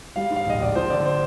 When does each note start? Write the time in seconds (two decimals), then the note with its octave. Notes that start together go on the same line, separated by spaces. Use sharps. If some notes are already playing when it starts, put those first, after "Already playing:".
0.16 G3 F5
0.31 G#2
0.36 F5
0.46 A#1 D#5
0.61 A#1 D5
0.75 F3 C5
0.90 D3 D5
1.05 C5